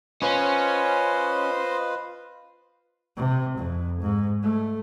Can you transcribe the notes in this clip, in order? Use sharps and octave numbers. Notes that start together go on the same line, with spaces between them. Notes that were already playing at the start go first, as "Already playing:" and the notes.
C#4 F4 B4 C5 D#5
C3
F2
G#2
A3